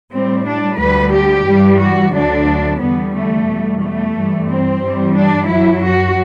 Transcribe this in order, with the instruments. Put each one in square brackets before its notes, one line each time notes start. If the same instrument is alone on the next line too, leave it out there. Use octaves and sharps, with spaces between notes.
[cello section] A2 G3 C4
D4
D2 D3 G3 B4
G4
G2 E3 G3
F#4
D2 D3 F#3 D4
E2 D3 G3 B3
A3
E2 B2 G3
A3
G2 E3 G3
C4
G2 E3 G3
D4
F#2 F#3 E4
F#4